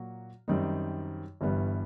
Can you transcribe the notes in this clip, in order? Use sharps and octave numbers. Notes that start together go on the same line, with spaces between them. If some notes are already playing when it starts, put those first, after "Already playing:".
Already playing: A#2 F#3 A#3 F#4
F#2 D#3 G3 C4 D#4
G1 G2 E3 G3 B3